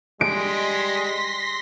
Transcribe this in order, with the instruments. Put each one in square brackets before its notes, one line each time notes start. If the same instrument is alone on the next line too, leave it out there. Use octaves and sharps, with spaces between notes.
[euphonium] G3 [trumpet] G#3 [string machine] C6 A#6 B6 [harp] D7